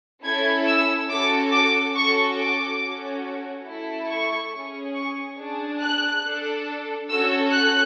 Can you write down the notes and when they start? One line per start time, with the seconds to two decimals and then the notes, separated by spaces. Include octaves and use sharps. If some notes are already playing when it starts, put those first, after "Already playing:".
0.24 C#4 E4 A4 G#6
0.67 E6
1.09 C#4 F#4 A4 D6
1.52 D6
1.95 C#4 F#4 A4 C#6
2.37 D6
2.81 C#4 F#4 A4
3.66 A3 E4 A4
4.09 C#6
4.52 C#4 G#4
4.95 C#6
5.38 D4 G#4
5.81 F#6
6.24 D4 A4
7.09 C#4 F#4 A4 E6
7.52 F#6